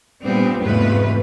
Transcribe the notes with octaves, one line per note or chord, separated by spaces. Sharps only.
A#2 G3 B3 C4 D4
E2 G#2 C3 A3 F4 B4